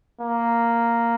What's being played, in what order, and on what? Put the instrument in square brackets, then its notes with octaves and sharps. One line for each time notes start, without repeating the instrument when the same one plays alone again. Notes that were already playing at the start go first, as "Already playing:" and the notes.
[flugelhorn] A#3